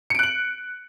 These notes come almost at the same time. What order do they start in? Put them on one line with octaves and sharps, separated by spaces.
C#7 D7 F#6 F#7